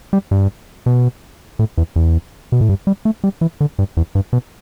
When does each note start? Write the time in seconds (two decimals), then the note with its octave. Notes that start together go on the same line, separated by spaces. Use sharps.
0.13 G3
0.31 G2
0.86 B2
1.59 A2
1.78 E2
1.96 E2
2.52 B2
2.61 A2
2.69 G2
2.87 G3
3.05 A3
3.24 G3
3.41 E3
3.61 D3
3.79 G2
3.97 E2
4.15 G2
4.33 B2